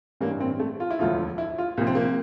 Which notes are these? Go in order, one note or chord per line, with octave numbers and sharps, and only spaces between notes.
A1 G2 E3 A#3
C4
A3
F4
E4
E1 D2 D3 F3 F4
E4
F4
C2 A#2 F3 A#3
C4
A#3